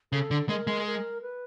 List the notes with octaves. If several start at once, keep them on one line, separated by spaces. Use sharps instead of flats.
C#3 A4
D3
G#3 A#4
G#3
A#4
B4